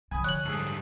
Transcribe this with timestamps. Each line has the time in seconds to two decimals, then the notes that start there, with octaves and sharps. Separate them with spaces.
0.11 D3 F3 G#5 B5 D#6
0.24 C#5 F#6 F#7
0.45 G#2 G3 G#4 A4